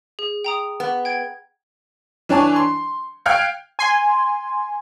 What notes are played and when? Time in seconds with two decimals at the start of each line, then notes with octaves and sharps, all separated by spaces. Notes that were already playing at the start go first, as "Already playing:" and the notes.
0.19 G#4
0.44 G5 A#5 D#6
0.80 B3
1.05 G5 G#6 D7
2.29 E3 D4 C#5 G#5 A5
2.56 C6
3.26 F5 G5 F6 F#6 G#6 C#7
3.79 G#5 C6